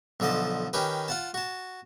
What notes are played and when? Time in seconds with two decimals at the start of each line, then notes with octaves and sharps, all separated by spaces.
0.20 B1 D3 F3 D#5 A5
0.73 D#3 C#4 G4 B4
1.08 F4 F#5 A5
1.34 F#4 A5